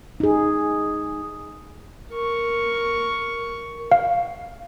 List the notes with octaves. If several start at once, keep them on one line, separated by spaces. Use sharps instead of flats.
D#4 G#4
A#4 C#6
F5